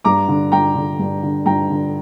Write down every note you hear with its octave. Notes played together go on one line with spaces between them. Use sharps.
G2 A#5 D6
D3
G2 G5 A#5
D3
G2
D3
G2 G5 A#5
D3